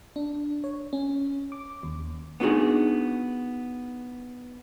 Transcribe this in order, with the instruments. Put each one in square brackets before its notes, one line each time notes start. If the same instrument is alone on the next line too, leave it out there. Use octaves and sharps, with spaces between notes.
[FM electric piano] D4
C#5
C#4
D6
D#2
[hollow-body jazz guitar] B3 D4 D#4 F#4 G#4